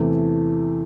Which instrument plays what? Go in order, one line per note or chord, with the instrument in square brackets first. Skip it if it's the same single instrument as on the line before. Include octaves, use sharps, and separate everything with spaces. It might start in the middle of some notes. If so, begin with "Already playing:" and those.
Already playing: [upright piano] E2 C3 E3 A3